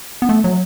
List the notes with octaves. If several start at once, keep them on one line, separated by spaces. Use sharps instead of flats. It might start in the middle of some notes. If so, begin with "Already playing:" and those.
B3
A3
F#3